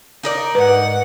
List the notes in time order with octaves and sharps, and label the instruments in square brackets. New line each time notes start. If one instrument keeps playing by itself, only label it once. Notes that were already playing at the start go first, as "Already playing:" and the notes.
[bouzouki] D#4 A#4 D5
[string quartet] G#2 F#5 [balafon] B4